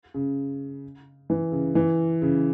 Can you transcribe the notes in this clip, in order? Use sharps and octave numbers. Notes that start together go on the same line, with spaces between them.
C#3
E3
C#3
E3
C#3